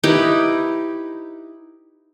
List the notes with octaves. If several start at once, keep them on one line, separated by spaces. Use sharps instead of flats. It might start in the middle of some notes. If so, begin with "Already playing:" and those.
D#4 E4 G4 B4